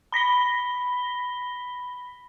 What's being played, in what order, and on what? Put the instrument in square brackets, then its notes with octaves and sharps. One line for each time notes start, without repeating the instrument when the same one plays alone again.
[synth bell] B5 A#6 B6 G7